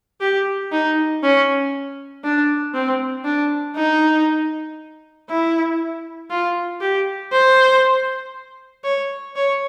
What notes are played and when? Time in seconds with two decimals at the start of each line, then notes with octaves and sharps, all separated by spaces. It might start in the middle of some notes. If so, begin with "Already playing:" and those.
0.21 G4
0.72 D#4
1.23 C#4
2.24 D4
2.74 C4
3.25 D4
3.76 D#4
5.29 E4
6.30 F4
6.81 G4
7.32 C5
8.84 C#5
9.36 C#5